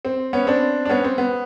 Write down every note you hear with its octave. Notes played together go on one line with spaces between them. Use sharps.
C4
B3 C#4
C4 D4
D4
B3 C#4
C4
B3